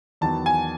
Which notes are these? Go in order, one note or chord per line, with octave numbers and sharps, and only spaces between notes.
E2 D#3 F#3 B3 A5
G#5